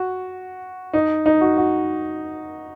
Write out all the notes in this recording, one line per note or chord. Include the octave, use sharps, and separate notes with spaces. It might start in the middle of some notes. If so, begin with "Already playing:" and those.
Already playing: F#4
D#4
D#4
F#4
F#4